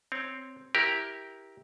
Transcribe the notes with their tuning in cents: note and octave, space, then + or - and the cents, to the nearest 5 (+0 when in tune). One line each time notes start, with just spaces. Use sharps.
C4 +0 C#5 +0
E4 -15 G4 +0 A#4 +10